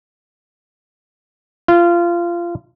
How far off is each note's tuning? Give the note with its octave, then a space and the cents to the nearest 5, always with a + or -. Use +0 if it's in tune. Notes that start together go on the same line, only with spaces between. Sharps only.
F4 -20